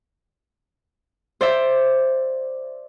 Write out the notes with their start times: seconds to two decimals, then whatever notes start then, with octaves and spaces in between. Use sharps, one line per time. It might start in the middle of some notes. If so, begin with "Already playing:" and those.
1.41 C5 D5 E5